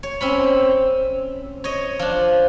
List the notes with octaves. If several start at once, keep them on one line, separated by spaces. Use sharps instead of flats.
C#5
C4 C#4 B5
C#5 D#5
F3 D4